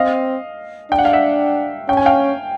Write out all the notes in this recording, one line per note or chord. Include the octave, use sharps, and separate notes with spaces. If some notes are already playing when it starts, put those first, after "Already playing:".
Already playing: C4 D#5 F5
D4 G5
F#5
F5
E5 F#5
C#4 G5
G#5
F5 G5